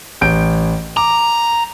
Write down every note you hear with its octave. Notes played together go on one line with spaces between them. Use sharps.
A1 G6 D7
A#5 D6